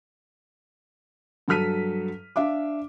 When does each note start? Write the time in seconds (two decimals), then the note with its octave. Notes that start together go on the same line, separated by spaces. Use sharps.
1.48 G2 F#3 A4 F6 B6 D#7
2.36 D4 E5 F5 D6